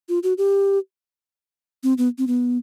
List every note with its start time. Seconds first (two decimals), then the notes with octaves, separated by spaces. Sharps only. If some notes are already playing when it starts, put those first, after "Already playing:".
0.09 F4
0.23 F#4
0.38 G4
1.83 C4
1.98 B3
2.18 C4
2.27 B3